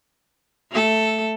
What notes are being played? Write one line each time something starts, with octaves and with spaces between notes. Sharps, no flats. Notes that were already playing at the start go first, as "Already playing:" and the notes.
A3 A4